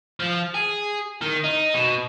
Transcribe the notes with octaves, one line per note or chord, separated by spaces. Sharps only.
F3
G#4
D#3
D#4
B2